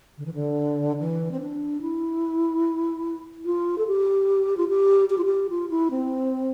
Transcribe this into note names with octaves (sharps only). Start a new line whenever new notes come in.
D3
E3
D3
E3
C4
D4
E4
F4
A4
G4
F4
G4
G4
F4
G4
F4
E4
C4